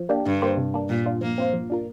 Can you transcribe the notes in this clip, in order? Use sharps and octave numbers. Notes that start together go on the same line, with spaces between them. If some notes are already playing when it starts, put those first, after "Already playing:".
Already playing: F3
A#3 D4 G4
G2 D3
A#3 G4 C5
C3
A#3 D4
A#2 G3
D4 F4
F3 A#3
C4 F4 C5
F3
D4 F4 A#4